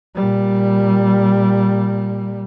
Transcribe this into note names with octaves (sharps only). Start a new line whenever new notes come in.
A#2 G3